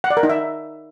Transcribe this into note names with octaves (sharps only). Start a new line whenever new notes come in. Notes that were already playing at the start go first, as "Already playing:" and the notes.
F#5
D5
A#4
D#4
E5